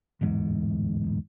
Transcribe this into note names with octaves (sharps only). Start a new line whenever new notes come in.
D1 E2 G#2